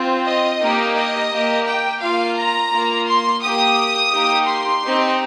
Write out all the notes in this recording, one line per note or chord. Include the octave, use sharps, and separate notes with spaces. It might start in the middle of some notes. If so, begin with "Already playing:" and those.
Already playing: C4 F4
D#5
A#3 D#4 G4
D#5
A#3 G4
G5
A#3 F4 F5
A#5
A#3 F4
C6
A#3 G4 D#6
A#3 D#4 G4
C6
C4 D#4 G4